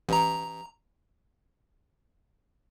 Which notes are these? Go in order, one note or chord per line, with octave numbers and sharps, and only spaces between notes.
A1 A#5